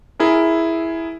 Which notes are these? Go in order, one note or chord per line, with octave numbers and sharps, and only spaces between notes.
E4 G#4 A#4